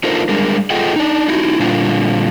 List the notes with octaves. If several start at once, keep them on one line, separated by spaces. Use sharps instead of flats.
D4 D#4 F4 A4 A#4 C5
G3 G#3 D4 G#4 A#4
F4 G#4 A4 D#5 F#5 G5
D4 D#4
D#4 E4 F#4
A#2 D3 G3 D4 F4